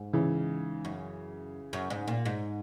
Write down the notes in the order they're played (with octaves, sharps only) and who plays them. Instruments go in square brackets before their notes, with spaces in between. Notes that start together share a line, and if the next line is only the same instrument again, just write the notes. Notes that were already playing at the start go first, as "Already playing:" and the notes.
Already playing: [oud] G#2
[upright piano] C#3 E3
[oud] F#2
F#2
G#2
A#2
G#2